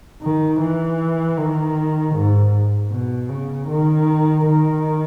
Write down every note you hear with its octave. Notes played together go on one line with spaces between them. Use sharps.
D#3
E3
D#3
G#2
B2
C#3
D#3
D#3